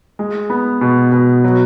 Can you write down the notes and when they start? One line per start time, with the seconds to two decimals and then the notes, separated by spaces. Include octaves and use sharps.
0.19 G#3
0.50 B3
0.81 B2
1.12 B2
1.44 F#3